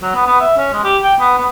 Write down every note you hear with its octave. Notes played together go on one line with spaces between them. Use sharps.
F#3
B3
B3
E5
C#4
G#3
G4
G5
B3
B3